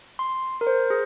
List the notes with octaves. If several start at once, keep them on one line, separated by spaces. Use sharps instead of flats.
C6
A#4
C5
G#4